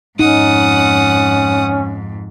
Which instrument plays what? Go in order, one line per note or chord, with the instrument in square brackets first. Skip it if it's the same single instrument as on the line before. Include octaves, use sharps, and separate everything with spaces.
[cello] F2 G#2 [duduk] C#4 [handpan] D#4 [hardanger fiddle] F#5 D#6